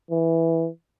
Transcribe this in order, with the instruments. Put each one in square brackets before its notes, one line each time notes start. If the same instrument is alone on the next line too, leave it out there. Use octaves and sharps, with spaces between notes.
[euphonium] E3